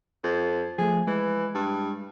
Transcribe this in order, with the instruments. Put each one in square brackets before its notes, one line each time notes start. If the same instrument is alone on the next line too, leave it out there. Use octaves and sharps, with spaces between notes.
[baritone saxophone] F2
[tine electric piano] F3 A3 [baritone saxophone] G#4
[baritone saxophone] E3 [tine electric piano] G#3
[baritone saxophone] G2